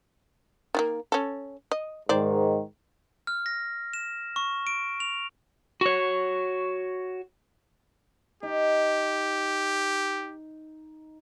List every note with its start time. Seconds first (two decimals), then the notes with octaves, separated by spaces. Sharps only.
0.75 D#3 G3 A#3
1.12 C#4 A4
1.72 D#5
2.09 G#2 D#3 C5 D5
3.27 F6
3.46 A#6
3.94 E7
4.36 C#6
4.67 D7
5.00 F7
5.81 F#4 C#5
8.43 D#4 G4